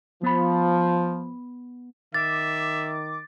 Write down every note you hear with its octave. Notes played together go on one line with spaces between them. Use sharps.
F3 B3 B5
D#3 E5 D6 A6